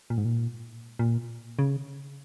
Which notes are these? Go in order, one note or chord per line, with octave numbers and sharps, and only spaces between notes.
A#2
G#2
A#2
A#2
C#3